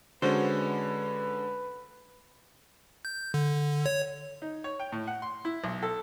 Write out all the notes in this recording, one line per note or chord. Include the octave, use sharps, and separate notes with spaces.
D3 G#3 C#4 F#4 B4 C5
G6
D3
C#5
D#4
C#5
G5
A2
F#5
C6
E4
B1
A4